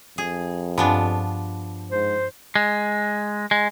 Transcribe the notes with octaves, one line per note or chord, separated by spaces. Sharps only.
F2 G#4
G2 F3 B3 D4 G#5
G#2 C5
G#3
G#3